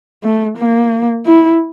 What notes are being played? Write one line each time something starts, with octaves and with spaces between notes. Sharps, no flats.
A3
A#3
E4